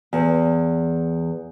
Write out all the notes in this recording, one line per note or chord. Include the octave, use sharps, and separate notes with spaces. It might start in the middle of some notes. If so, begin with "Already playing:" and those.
E2